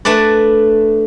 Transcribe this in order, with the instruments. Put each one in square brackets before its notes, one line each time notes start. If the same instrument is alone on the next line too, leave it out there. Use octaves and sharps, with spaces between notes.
[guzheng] A3 D4 B4 D5